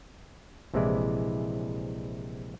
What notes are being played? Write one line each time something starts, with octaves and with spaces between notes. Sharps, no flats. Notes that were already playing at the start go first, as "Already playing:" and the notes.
A#1 C3 E3 G#3 E4 D5